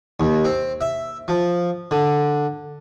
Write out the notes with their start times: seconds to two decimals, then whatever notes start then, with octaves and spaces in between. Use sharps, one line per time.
0.20 D#2
0.45 C4
0.81 E5
1.28 F3
1.91 D3